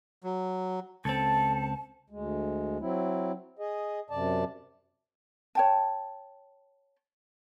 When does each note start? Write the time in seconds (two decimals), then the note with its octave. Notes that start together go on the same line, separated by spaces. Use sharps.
0.23 F#3
1.05 C#2 C4 A4 A5
2.10 D2 G#3
2.80 F#3 C4 E4
3.59 G#4 D#5
4.10 F#2 C3 D5 A5
5.55 C#5 G5 A5